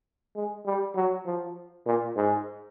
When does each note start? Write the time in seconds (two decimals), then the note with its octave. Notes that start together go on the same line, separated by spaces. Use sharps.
0.36 G#3
0.66 G3
0.96 F#3
1.26 F3
1.86 A#2
2.16 G#2